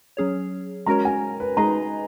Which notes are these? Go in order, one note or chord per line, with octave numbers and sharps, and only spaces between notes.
F#3 C#4 G#4 C#5
G#3 C#4 F#4 A#4 C#5 A#5
G#5
B4
G#3 D#4 G#4 B4 D#5 A#5